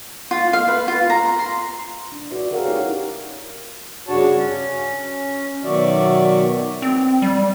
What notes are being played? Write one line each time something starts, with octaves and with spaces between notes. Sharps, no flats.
F4
F5
B4
F4
A#5
C6
D4
F#4 A4 B4 D5 E5
G4 G#4 A#4 C#5 F5 F#5
C#4 D#4 E4 C#5
G2 C#3 D4 F#4 C#5 A5
C#4
B2 D#3 F#3 F#4 D5 E5
C4
G3